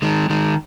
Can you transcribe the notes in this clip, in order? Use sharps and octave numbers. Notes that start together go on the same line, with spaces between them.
D#3 G#3
D#3 G#3